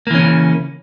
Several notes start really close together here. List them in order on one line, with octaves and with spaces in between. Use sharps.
A#3 E3 C#4 C#3